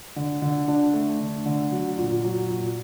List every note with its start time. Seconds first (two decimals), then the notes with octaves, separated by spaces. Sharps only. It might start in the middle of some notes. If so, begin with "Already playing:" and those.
0.16 D3
0.42 D3
0.68 D4
0.94 A3
1.20 D3
1.46 D3
1.72 F#3
1.98 A#2
2.24 F#3
2.50 A#2